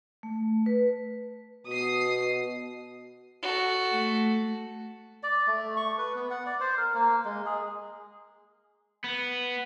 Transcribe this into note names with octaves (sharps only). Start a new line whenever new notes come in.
A3
B4
B2 D#6 C7
F#4 A4
A3
D5
A3
C#6
B4
B3
F#5
D5
C5
A#4
A#3
G#3
G#4
B3